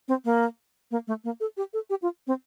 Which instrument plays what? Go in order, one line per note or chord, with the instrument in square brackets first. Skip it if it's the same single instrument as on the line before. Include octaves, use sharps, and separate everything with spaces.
[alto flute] C4
A#3
A#3
A3
A#3
A4
G4
A4
G4
F4
C4